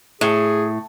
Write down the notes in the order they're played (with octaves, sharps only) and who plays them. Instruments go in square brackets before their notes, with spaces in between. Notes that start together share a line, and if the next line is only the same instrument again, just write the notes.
[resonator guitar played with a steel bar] A2 [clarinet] G#4